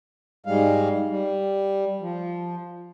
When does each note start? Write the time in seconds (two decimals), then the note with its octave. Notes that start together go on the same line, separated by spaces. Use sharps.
0.46 G#2 G3 G#3 F5
1.09 G3
2.01 F3